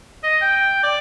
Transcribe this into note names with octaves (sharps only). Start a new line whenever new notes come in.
D#5
G5
D5